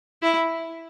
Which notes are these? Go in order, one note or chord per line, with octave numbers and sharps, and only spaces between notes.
E4